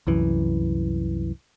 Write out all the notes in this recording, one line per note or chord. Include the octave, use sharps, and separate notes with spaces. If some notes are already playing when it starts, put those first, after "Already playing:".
C2 F#2 E3